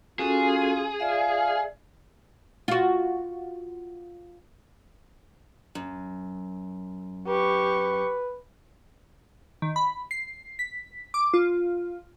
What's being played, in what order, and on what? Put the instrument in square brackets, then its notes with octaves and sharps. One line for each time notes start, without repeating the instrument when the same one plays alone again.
[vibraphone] C#4 F#4 A4 [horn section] F4 [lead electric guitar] G#4
[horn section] F4 F5 [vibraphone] D5 E5
[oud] F4 F#4
[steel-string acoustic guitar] F#2
[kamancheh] G4 C#6 [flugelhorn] B4
[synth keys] D#3
B5
C7
B6
D6
F4